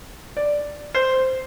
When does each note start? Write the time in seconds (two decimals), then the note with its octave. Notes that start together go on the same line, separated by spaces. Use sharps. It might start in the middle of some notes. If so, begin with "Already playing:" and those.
0.37 D5
0.95 C5